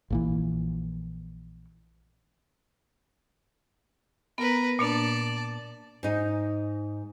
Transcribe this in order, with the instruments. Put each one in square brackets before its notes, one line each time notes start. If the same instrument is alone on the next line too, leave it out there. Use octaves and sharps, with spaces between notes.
[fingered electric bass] A#1 A#2 E3
[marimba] B3 [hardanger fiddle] A#4 B4
[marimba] A#2 A#3 D4 [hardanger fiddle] D5 A5
[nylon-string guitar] G#2 D#4